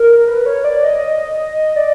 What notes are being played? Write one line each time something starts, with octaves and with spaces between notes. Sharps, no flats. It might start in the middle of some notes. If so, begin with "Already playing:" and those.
Already playing: A#4
B4
C#5
D5
D#5
D5